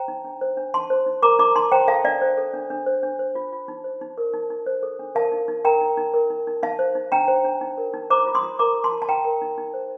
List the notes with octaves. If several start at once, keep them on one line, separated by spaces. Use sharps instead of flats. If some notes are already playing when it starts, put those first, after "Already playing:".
Already playing: C5 G5 A#5
D#4
D4
C5
D4
D#4 A5 C6
C5
D#4
A#4 A#5 D6
D#4 A#5 D6
D#4 A5 C6
C5 G5 A#5
A4 F5 A5
D4 D5 F5
C5
A4
D4
D4
C5
D4
C5
F4
F4
D#4
C5
D#4
A#4
D#4
D#4
C5
A4
D4
A#4 F5 A5
D#4
D#4
A#4 G5 A#5
D#4
D#4
A#4
D#4
D#4
D#4 F5 A5
C5
D#4
D4 G5 A#5
C5
D4
D#4
A#4
D#4
C5 A#5 D6
F4
C6 D#6
F4
A#4 A#5 D6
F4
A5 C6
F4
A5
D#4 G5 A#5
A#4
D#4
D#4
C5